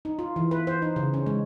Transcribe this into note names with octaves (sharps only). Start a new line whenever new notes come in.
D#4
F4
E3
B4
C5
D#4
C#3
C#4
G#3